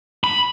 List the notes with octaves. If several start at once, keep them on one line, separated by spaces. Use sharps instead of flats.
B5